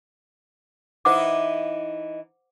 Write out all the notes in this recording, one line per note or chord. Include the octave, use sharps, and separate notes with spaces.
E3 D#4 E4 C5 F#5 D6